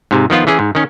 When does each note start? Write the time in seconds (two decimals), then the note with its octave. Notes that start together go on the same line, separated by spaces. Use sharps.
0.11 G#2 C3
0.30 D#3 F3 B3 F4
0.47 E3 C#4 G#4
0.59 G#2
0.75 D#3 C#4